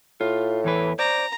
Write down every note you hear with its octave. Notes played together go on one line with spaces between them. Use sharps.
A2 F4
E2 E3 B4
C5 D5 A#5